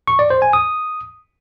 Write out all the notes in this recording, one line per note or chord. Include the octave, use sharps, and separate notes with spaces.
C#6
D5
C5
G#5
D#6